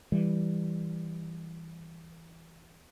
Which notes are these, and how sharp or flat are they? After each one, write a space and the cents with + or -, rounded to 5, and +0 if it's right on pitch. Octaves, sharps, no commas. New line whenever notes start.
E3 +0 G3 +0